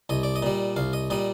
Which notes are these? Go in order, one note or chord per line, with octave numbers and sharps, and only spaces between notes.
C2 D#5
D5
D#5
A#2 G3
C2 F5
D#5
A#2 G3 D#5